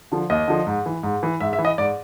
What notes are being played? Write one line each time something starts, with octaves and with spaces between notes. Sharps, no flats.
D3 F3
D#2 D#5
D3 F3
G#2
E3
G#2
E3
G#2 E5
E5
E3
D#5
G#2 D5